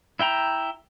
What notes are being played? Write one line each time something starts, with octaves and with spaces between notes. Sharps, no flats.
E4 E5 G5 A#5